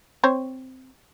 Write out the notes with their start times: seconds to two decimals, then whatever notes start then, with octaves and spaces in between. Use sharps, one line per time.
0.24 C4 C5 C#5